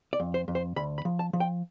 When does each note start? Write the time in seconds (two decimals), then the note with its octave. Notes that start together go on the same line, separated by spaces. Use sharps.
0.13 D5
0.20 F2
0.34 C5
0.48 F2
0.55 C5
0.76 D2 B5
0.98 B5
1.05 F3
1.19 A5
1.33 F3
1.40 G5